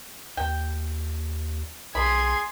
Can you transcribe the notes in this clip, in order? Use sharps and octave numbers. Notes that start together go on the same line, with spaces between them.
D#2 G5
B1 G#4 B5 C6 G#6